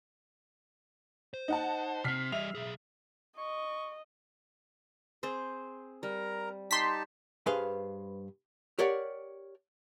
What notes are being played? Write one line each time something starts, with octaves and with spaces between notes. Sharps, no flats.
C5
D#4 F#5 A5
C3 C4 F6 B6 C7
G3 D#5 E5 F7
B1 G#4
D#5 C#6
C4 G#4 C5
G3 A#4 A#5
D#4 G4 A5 C6 B6
G2 G#4 B4 C5 F5 C6
G4 A#4 C#5 D5 F#5